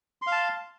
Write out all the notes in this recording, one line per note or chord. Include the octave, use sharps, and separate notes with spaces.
F5 A5 C6